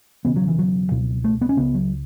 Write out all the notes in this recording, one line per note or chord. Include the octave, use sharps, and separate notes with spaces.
E1 E2 C#3 B3
F#3
E3
F#3
C#2 B2
A3
B3
C#4
C#2 C#3 B3
F#3